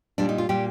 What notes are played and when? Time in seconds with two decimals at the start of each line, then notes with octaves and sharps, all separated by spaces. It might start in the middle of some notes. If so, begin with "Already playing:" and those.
0.18 A#2 G3 D4
0.29 D#4
0.38 F4
0.49 A#2 G3 G4